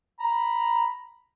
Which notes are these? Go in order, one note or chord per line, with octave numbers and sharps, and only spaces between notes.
A#5 B5